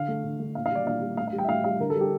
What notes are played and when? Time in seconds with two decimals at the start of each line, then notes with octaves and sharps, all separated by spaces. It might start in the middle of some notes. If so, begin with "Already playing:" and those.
Already playing: D3 F5
0.08 A3
0.24 D3
0.40 A3
0.55 A#2 F5
0.66 F5
0.71 G3 D5
0.86 A#2 F5
1.01 G3
1.17 A2 F5
1.27 F5
1.33 G3
1.38 G5
1.44 E5
1.49 A2 F5
1.64 G3 F5
1.79 D3 A#4
1.90 A4
1.95 G3
2.01 G4